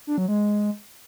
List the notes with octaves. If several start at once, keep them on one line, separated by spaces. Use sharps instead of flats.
D4
F#3
G#3